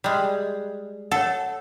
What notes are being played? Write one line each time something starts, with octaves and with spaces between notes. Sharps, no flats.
G3 G#3
A4 C#5 F#5